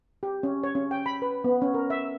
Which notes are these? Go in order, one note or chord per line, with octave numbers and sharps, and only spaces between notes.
G4
C#4
C#5
C#4
G5
B5
B4
B3
C#4
A#4
E5